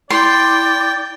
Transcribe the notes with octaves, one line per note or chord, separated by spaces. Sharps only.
E4 D5 G5 C6